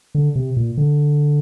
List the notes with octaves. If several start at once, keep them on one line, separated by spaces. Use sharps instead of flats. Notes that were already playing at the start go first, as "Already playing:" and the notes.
D3
C3
A#2
D3